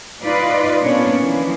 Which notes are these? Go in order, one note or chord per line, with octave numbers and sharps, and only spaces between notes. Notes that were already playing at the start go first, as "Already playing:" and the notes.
D#4 F4 B4 D5 D#5
A#2 A#3 B3 C#4 D4 C#5
E3 F3 A#3